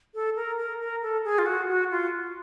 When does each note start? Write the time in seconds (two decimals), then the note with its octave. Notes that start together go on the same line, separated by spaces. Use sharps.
0.14 A4
0.36 A#4
0.58 A#4
0.81 A#4
1.03 A4
1.25 G#4
1.39 F4
1.46 F#4
1.69 F#4
1.91 F4